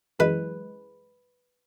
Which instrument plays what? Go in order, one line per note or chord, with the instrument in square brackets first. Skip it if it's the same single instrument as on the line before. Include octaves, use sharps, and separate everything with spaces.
[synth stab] F#2 E3 G#3 [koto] B4